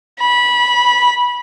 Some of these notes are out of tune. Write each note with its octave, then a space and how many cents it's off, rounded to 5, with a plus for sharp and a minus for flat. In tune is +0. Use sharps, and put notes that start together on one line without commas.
B5 -20